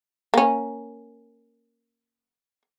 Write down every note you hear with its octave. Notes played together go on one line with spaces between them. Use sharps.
A#3 C#4